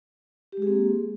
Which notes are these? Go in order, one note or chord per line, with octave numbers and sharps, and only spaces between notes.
G#3 A#3 C4 G4 G#4